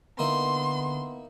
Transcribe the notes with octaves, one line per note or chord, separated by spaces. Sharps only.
D3 A#3 B3 D#4 E4 C6